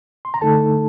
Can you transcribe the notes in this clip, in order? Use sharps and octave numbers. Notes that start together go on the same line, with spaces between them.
C6
A#5
D2 D3 A3 D#4 A4 A5